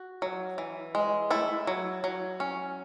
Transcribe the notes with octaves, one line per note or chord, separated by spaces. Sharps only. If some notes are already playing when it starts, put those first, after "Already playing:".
Already playing: F#4
F#3
E3
G#3
A3 E4
F#3
F#3
C#4